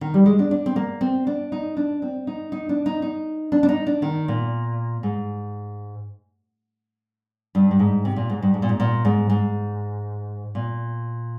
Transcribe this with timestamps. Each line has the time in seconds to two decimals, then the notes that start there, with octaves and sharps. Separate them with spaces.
0.01 D#3
0.14 G3
0.26 G#3
0.39 D4
0.51 D4
0.66 C4
0.76 A#3
1.01 C4
1.27 D4
1.52 D#4
1.77 D4
2.02 C4
2.27 D#4
2.52 D#4
2.69 D4
2.86 D#4
3.02 D#4
3.52 D4
3.63 D4
3.69 D#4
3.87 D4
4.02 D#3
4.28 A#2
5.03 G#2
7.55 G2
7.71 G2
7.79 G#2
8.05 C3
8.16 A#2
8.30 G#2
8.42 G2
8.54 G#2
8.62 A#2
8.69 G#2
8.80 A#2
9.05 G#2
9.30 G#2
10.55 A#2